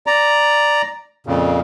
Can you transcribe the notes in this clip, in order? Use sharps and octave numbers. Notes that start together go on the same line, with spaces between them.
D5 A#5
F2 A#2 C#3